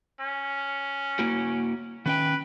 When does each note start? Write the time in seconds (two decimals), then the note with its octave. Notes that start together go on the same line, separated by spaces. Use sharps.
0.21 C#4
1.19 A#3 E4 F#4
2.06 D#3 C#4 B4 G5